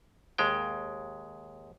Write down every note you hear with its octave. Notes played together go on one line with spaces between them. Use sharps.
D#2 G#3 G5